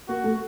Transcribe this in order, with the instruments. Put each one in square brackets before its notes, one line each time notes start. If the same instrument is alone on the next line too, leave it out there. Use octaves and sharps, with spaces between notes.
[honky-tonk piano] A#3 [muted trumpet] F#4
[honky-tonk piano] A3